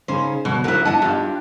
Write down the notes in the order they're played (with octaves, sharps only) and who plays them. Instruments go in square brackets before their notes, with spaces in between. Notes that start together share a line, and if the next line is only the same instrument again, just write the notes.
[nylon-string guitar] C#3 C#4 D#4 [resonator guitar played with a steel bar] C5
[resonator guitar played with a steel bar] B2 [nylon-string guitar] D3 F#3
[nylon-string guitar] D2 A#4 F#5 [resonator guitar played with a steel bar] F#3 E4
[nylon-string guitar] D4 E4 D#5 [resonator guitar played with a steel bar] F#5 A5
[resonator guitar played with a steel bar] G2 [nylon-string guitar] D4 F4 G4